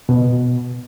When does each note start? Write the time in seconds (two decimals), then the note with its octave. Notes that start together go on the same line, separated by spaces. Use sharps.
0.09 B2